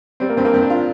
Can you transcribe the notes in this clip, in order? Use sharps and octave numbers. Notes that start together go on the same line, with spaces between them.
G3 C4
A#3
G2 C4
A#3
G2 C4
D4
F4